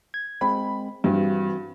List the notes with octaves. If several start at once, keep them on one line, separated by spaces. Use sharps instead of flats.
G#6
G#3 C4 B5
G2 E3 C4 F#4